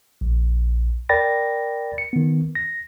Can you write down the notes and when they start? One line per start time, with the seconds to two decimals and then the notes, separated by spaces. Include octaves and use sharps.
0.21 A#1
1.09 A#4 D5 G5 B5 A6 A#6
1.98 C#7
2.13 D#3 B3
2.55 A#6